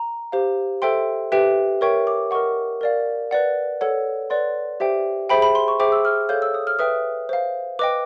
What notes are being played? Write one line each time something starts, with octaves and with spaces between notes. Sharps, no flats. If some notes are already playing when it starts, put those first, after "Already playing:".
Already playing: A#5
G4 C5 F5
A4 C5 E5 G5 C6
G4 B4 E5 G5
A#4 C#5 E5 G5 C#6
D6
A#4 D#5 F#5 C#6
A#4 D5 F5
B4 D5 F#5
A4 C#5 F#5
B4 D5 F#5 C6
G4 C5 E5 G5
G#4 C5 E5 G5 B5
B5
C6
C#6
G#4 C5 E5 G5 D6
E6
F6
A4 C#5 F5 G6
E6
D#6
F6
B4 E5 G5 D#6
C5 F5
B4 D#5 G5 D6